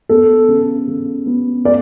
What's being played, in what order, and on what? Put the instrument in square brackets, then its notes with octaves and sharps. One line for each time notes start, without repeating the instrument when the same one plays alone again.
[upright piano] B3 [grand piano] A4
[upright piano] C#3
C#3
B3
[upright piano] A3 [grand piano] D5